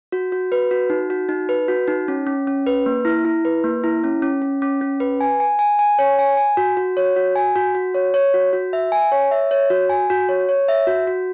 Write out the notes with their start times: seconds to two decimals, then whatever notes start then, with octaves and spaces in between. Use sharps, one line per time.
0.12 F#4
0.32 F#4
0.52 B4
0.71 F#4
0.90 D#4
1.10 F#4
1.29 D#4
1.49 B4
1.68 F#4
1.88 D#4
2.08 C#4
2.27 C#4
2.47 C#4
2.67 B4
2.86 A#3
3.05 E4
3.25 E4
3.45 B4
3.64 A#3
3.84 E4
4.04 C#4
4.22 C#4
4.42 C#4
4.62 C#4
4.81 C#4
5.00 B4
5.21 G#5
5.40 G#5
5.59 G#5
5.79 G#5
5.99 C#5
6.19 G#5
6.37 G#5
6.57 F#4
6.77 F#4
6.97 C#5
7.16 F#4
7.36 G#5
7.56 F#4
7.75 F#4
7.94 C#5
8.14 C#5
8.34 F#4
8.53 F#4
8.73 E5
8.92 G#5
9.12 C#5
9.31 E5
9.51 C#5
9.70 F#4
9.90 G#5
10.10 F#4
10.29 C#5
10.49 C#5
10.68 E5
10.87 F#4
11.07 F#4